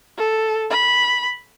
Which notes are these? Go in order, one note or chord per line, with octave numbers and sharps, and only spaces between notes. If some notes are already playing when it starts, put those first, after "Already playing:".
A4
B5